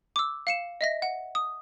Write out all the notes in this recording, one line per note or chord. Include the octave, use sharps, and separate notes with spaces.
D6 E6
F5 C#7 E7
D#5 E5 A#6
F#5
D#6